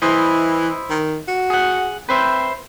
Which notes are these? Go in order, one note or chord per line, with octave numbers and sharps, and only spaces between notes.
E3 E4 C5 D#5
D#3
F#4
G#4 F#5
C4 B4 C5 E5